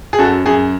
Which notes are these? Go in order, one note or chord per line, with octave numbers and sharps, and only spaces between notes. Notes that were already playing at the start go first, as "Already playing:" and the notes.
G#4
F#2 F#4 A4
F#2 G#4